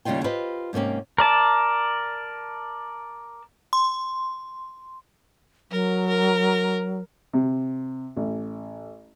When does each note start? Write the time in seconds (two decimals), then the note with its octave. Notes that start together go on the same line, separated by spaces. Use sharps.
0.05 D#2 C#3 G3 D#4 F4 G5
0.24 F4 G4 B4 C5 D#5
0.73 G#2 C3 A#3 C#4 G4
1.18 A#4 D5 A5
3.73 C6
5.71 F#3 A#4
6.08 A#4
7.33 C3
8.16 A1